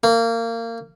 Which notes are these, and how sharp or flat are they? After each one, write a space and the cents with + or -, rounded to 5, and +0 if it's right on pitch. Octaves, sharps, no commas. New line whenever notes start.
A#3 -25